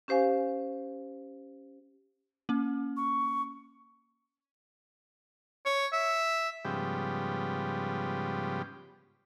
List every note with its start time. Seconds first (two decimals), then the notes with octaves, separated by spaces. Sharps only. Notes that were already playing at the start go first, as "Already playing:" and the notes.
0.08 C#4 G4 C5 F5 G#5
2.49 A#3 C#4
2.97 C#6
5.66 C#5
5.93 E5
6.65 G#2 C#3 F3 G3 B3 G4